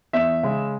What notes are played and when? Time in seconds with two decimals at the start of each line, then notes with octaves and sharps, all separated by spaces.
0.13 E2 E5
0.43 C#3 G#3